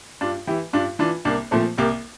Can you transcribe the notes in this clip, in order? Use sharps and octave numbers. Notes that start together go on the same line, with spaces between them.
G2 D4 F4
E3 E4 G4
G2 D4 F4
E3 D4 F4
C2 A#3 D4
A#2 F3 A3 C4
C2 G3 A#3